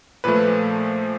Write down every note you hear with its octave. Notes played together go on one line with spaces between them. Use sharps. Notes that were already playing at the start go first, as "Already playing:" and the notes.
A#2 F3 A3 B4